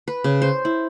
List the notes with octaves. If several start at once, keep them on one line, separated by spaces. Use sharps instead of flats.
B4
C#3
C5
E4